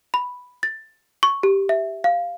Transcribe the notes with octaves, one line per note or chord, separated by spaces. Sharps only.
B5
A6
C#6
G4
E5
F5